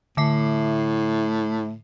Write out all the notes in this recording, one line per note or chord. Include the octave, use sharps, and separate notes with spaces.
A2 D3 E5 C7